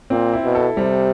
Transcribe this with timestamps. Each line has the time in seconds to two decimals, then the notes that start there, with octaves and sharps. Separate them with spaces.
0.10 A#2 C4
0.34 E4
0.44 B2
0.55 A4
0.77 C3 G3